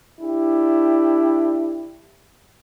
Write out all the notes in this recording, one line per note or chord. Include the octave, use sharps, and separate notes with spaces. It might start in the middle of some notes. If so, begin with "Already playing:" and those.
D4 E4 G4